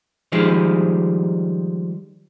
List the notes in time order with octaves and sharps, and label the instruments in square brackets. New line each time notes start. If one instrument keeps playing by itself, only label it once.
[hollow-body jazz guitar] D#3 F3 G3 G#3